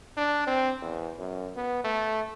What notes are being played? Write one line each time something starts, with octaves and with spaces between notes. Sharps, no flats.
D4
C4
E2
F#2
B3
A3